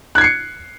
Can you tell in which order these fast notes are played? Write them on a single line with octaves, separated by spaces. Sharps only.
F#6 G#6 C7 C#7